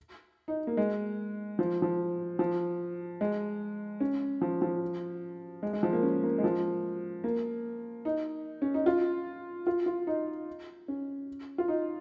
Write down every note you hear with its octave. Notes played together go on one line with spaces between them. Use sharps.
D#4
A#3
G#3
F3
F3
F3
G#3
C#4
F3
F3
G#3
G#3
F3
A#3
C#4
A#3
G#3
F3
A#3
D#4
C#4
D#4
F4
F4
F4
D#4
C#4
F4
D#4